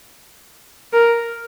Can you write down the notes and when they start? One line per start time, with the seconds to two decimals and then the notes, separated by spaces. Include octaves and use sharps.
0.93 A#4